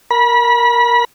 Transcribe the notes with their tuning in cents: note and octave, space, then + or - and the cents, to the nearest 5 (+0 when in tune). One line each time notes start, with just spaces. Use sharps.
A#4 +0 B5 -30